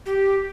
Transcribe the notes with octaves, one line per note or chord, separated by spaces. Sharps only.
G4